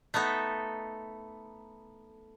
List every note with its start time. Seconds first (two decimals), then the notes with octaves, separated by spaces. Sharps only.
0.14 A3 B3 D#4 A4